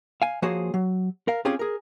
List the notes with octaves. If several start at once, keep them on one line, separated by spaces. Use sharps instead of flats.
F5 G#5
F3 A#3 F#4 G#4 C5 C#5
F#3
A#4 F5
C4 C#4 F4 G4 G#4 C#5
G#4 A#4